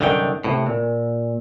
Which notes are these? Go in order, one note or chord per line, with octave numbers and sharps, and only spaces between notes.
C2 F#2 D3 D#3 G5
A2 C3
A#2